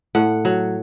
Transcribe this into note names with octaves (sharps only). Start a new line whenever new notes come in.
A2 F#5
F#3